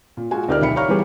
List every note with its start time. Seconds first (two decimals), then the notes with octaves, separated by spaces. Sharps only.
0.17 A#2
0.31 G#3 F4 F#4 G#5
0.48 D2 D#4 G4 A#4 D5 F6
0.61 B1 D#3 E5 B5 C#7
0.76 G4 C#5 F5 A#5 C#6 F6
0.88 E3 G3 B3 G4 G#4